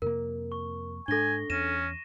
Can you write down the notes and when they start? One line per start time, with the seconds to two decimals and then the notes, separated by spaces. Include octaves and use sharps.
0.02 F2 C3 A#3 A#4
0.52 C#6
1.08 G#2 D4 A4 G#5 A#6 G7
1.50 E2 C#4 A#6 D#7 E7